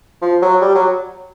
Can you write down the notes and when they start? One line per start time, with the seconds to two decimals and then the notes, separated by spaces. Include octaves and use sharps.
0.22 F3
0.42 F#3
0.62 G3
0.75 F#3